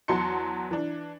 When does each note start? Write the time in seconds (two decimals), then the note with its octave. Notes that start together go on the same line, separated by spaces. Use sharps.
0.08 E2 F#3 F#4 A5 C6 C#7
0.71 E3 D4